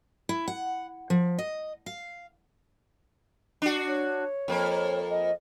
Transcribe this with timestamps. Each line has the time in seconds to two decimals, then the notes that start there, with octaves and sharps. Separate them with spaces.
0.29 E4
0.48 F#5
1.10 F3
1.39 D#5
1.86 F5
3.62 D4 F#4
3.88 C#5
4.48 F2 A#3
5.10 D#5